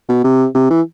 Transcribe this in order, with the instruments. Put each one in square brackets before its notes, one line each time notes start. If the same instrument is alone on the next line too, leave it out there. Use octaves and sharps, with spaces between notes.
[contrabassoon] B2
C3
C3
E3